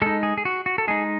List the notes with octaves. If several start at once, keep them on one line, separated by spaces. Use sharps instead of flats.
G#3 D#4 A4
G#4
G#4
F#4
F#4
A4
G#3 D#4 G#4